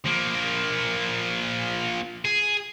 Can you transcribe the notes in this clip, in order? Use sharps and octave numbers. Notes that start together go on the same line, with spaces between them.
F3 A#3
G#4